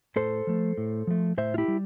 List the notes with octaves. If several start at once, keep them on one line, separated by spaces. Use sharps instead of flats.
A2 A4 C5
F3 A3
A2
F3 A3
A2 C5 E5
F4
E4 G4
G3